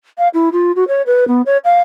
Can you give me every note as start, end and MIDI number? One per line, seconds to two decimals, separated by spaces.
0.18 0.28 77
0.34 0.49 64
0.52 0.72 65
0.76 0.84 66
0.88 1.02 73
1.06 1.24 71
1.28 1.42 59
1.46 1.57 73
1.64 1.82 77